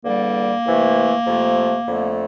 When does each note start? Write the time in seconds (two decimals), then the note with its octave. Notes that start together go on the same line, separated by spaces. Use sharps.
0.04 E2 D3 G3 A#3
0.66 C2 C3 E3 A3
1.27 F2 C3 F3 A3
1.88 F2 D3 A3